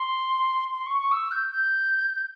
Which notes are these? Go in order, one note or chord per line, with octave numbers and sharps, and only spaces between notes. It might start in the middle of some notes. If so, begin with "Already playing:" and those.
Already playing: C6
C6
C#6
C#6
E6
G6
G6